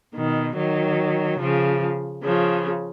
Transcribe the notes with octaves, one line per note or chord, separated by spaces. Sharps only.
B2 D#3
D#3 F#3
C#3 F3
C#3 F3